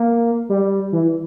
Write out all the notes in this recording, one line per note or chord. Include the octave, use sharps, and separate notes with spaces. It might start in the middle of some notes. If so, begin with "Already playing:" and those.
Already playing: A#3
G3
E3